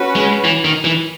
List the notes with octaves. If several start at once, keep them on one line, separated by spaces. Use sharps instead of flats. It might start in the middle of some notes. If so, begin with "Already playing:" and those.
Already playing: C#4 F#4 B4
G#3
E3
D#3
E3